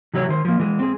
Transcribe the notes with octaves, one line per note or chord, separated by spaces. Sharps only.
C3 E3 F#3 E4 C#5
D#3 C5
F3 A#3
E3 G#3
C4 G#4